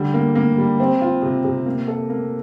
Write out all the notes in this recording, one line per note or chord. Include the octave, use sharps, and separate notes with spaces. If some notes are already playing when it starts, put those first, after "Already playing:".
Already playing: D3 G3
A#3
A#3
G3
C4
F4
C3
C3
A#3
A4
A#3